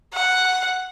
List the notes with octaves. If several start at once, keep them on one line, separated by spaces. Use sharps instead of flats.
F#5